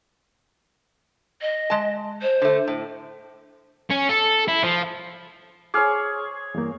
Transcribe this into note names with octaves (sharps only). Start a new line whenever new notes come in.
D#5
G#3 A5
C5
D3 A3
A2
C#4
A4
E4
F3
G#4 C#5 D6 F6
E2 G2 A#3